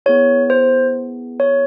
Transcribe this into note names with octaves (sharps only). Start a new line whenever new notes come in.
B3 E4 G#4 C#5
C5
C#5